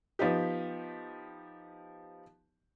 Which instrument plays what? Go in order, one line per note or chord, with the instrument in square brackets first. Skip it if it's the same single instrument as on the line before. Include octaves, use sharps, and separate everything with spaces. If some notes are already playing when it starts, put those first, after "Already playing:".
[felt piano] F3 B3 D#4 G4